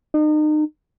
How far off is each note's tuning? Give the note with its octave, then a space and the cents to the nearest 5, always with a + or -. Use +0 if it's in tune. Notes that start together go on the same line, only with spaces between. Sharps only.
D#4 -35